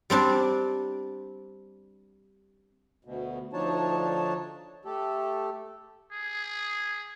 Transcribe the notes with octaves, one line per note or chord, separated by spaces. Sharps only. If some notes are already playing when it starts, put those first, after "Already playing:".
G3 C4 D4 D5
D2 B2
D2 F3 D4 D#4 C#5 A5
A3 G4 A4
G#4